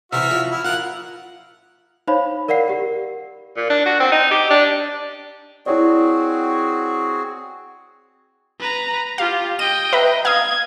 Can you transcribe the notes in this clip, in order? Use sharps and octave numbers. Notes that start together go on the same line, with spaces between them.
C3 E3 F#4 E5 F6
F3 F#3
E4
F3 F4 A#4 F#5
D#4 C5 C#5 F5 B5
A#4 D5 F5 F#5 C7
G4 A#4
A#2
D4
F#4
C4
D#4
G4
D4
C4 E4 F#4 G#4 C#5 D5
B4 A#5
F4 G4 F5
D#5 G5 D#7
B4 E5 A#5
F5 D#6 G#6